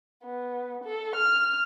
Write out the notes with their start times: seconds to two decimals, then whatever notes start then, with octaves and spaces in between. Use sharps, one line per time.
0.24 B3
0.84 A4
1.16 F6